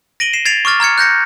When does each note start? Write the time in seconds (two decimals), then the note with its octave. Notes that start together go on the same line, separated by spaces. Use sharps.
0.20 A#6 D7 D#7 F#7 G7
0.33 C7 E7
0.45 G#6 A6 C7 D7 F7
0.65 C#6 D6 F6 A6
0.80 A#5 F6 G#6 C#7
0.98 F#6 G6 A#6 C#7